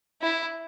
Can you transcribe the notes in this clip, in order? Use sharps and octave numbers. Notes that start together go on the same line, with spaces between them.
E4